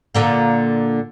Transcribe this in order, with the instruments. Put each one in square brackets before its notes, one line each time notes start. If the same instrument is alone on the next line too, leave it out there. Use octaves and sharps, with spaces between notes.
[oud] A#2 D3 A#3